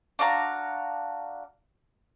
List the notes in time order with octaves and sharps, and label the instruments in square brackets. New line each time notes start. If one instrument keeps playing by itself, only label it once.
[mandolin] D4 F#4 F5 A#5